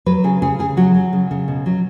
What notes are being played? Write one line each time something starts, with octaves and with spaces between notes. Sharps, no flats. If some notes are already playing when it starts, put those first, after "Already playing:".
F#3 B4
C#3 G#4
C#3 G#4
C#3 G#4
F#3 F#4
F#3
C#3
C#3
B2
F#3